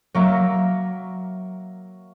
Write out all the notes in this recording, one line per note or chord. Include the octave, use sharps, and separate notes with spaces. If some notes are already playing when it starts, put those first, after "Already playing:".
F#3 A#3 E5